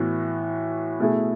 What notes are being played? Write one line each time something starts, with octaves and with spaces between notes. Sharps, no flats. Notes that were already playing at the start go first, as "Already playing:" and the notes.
Already playing: A2 E3 B3 F#4
B2 A3 E4 G#4